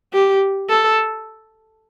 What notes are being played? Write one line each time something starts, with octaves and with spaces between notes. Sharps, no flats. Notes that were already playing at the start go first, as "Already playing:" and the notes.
G4
A4